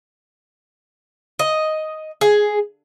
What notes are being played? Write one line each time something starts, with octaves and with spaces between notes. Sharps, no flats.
D#5
G#4